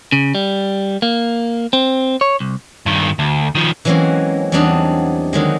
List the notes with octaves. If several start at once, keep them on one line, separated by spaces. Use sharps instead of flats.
C#3
G3
A#3
C4
C#5
C2
G2 D#3
D2
D#3 F3
E3 F#3 G#3 A#3 C4 C#4
E2 F#3 G3 C4 D4 D#4
D3 D#3 F#3 G#3